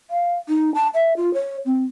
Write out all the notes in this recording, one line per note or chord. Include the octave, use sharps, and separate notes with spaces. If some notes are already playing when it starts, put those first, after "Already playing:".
F5
D#4
A5
E5
F4
C#5
C4